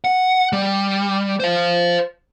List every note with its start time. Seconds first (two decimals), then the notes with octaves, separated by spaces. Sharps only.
0.04 F#5
0.53 G3
1.40 C5 F5